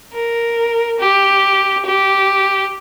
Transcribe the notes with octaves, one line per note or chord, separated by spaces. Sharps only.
A#4
G4
G4